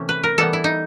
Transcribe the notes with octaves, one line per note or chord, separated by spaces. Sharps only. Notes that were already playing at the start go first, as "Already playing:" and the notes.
Already playing: C3 E3 A3 C#4
B4
A#4
E3 G3 B3 A4
E4
D#4